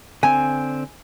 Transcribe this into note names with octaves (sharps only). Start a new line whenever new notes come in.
D3 C4 G#5